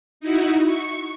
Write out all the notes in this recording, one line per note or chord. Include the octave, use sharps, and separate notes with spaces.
D#4 E4 F#4
C#6